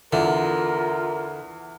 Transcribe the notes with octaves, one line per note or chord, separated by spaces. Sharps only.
E2 D3 F4 A#4